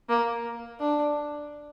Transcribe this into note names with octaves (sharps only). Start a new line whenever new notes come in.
A#3
D4